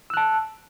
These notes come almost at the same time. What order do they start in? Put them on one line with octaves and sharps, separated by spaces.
E6 F#6 A5